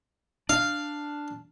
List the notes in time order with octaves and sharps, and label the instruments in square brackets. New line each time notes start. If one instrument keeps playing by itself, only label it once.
[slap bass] D4 [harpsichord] F5